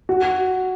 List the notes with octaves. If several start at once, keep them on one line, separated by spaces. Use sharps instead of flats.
F#4